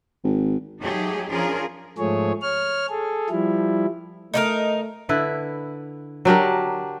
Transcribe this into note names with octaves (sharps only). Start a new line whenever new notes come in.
G#1
F#3 A3 D#4 G4 G#4
F3 C#4 D4 F4 G#4 A#4
G#2 F3 A3 G#4 C#5
C#5 F6
G#4 A4
F3 G3 E4
A3 D#4 E4 A#4
D3 E4 B4
F#3 D4 G4 A#4